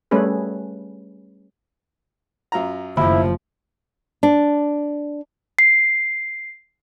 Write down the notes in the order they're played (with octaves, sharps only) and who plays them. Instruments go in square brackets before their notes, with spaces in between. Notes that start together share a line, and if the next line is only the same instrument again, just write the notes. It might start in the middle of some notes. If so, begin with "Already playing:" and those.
[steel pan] G3 A3 C#4 G#4 B4
[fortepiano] F#2 F4 A#5
[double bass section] F#1 [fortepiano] D#2 A2 [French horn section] F3 [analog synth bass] E4
[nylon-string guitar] D4
[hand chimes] C7